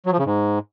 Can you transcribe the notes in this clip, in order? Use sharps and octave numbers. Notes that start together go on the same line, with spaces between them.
F#3
F3
C#3
G#2